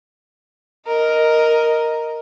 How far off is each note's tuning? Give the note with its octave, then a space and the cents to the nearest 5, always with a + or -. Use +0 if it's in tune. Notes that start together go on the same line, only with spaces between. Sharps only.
A#4 +0 D#5 +0